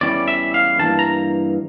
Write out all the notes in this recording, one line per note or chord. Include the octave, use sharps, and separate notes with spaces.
E2 E3 G3 C#4 E4 D5
E5
F5
G2 E3 A#3 A5
A#5